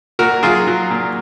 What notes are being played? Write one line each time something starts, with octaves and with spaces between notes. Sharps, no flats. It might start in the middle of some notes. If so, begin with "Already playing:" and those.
A#2 F#4 A#4
F#3 F4 G#4
F#3
A#2